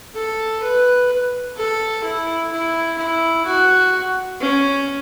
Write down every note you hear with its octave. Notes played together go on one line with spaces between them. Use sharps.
A4
B4
A4
E4
E4
E4
F#4
C#4